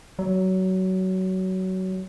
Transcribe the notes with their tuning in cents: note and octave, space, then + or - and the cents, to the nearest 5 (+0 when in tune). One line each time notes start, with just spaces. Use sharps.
F#3 +20